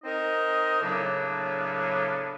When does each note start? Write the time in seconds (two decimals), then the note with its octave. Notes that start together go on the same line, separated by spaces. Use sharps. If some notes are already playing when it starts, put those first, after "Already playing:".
0.04 C4 D#4 A#4 D#5
0.80 A2 C#3 F#3 A#3 B3 D4